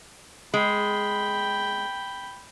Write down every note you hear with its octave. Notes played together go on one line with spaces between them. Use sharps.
G#3 G5 B5